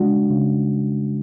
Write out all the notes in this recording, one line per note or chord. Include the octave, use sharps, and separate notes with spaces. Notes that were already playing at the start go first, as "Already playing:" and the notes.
Already playing: C#3 G#3 D4 F#4
C#3